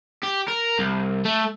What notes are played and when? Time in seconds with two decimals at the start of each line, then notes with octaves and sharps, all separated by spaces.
0.23 G4
0.48 A#4
0.79 C2
1.25 A3